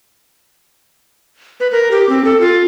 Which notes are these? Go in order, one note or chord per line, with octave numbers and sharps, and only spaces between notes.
B4
A#4
G4
C4
A4
F4